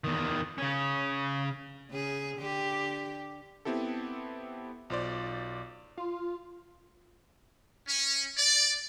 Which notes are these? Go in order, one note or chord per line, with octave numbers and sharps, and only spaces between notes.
E2 D#3
C#3 C#4
C#3 G#4
D3 G4
B3 C4 E4 G4 A4
B1 F4 C5 D5
F4
C#4
D5